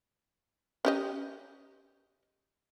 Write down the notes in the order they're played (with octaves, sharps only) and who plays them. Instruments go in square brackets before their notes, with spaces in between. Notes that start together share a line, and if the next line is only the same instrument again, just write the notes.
[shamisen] C#4 G4 D#5